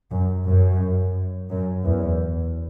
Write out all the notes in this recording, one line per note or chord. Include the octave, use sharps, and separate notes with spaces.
F#2
F#2
F#2
E2